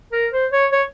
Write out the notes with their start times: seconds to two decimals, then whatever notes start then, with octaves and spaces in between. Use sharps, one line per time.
0.12 A#4
0.32 C5
0.52 C#5
0.72 C#5